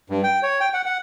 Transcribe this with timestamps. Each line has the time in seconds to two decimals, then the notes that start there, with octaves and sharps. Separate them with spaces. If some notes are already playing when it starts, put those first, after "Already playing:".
0.10 G2
0.23 G5
0.43 C#5
0.60 G5
0.74 F#5
0.86 F#5